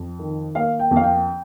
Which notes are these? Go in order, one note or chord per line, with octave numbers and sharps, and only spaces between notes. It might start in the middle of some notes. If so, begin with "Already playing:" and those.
Already playing: F2
D#3
A#3 F5
G5
F2
F5
G5